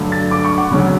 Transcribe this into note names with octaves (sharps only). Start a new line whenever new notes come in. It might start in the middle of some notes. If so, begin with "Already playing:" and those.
Already playing: G2 D3 F#3 A3
A6
D6
C#6
F#5
D2 C#3 F#3 C#4